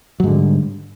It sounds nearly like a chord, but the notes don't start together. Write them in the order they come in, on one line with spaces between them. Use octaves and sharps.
F#3 G#2 D3 G3